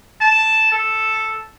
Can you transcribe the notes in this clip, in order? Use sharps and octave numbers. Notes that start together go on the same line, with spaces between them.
A5
A4